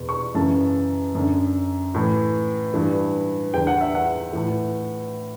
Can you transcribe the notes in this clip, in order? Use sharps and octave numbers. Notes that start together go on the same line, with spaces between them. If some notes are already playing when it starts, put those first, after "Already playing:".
Already playing: E2 B2
C#6
F#2 C#3 E3 A5
F#2 D3
A2 E3
G2 E3
E2 D3 G5
F#5
E5
F#5
A2 E3